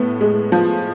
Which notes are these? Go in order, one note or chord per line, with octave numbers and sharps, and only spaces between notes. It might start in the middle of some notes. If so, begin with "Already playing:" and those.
Already playing: A2 B3
G#3
F3